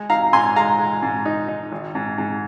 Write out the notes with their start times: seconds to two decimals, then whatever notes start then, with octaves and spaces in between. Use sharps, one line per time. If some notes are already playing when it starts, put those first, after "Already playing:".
Already playing: G#3
0.10 D#4 F5 A#5
0.33 G#2 G#5 C6
0.56 G#3 F5 A#5
0.79 G#3
1.02 G#2
1.26 D#4
1.48 D#4
1.72 G#1
1.95 G#2
2.18 G#2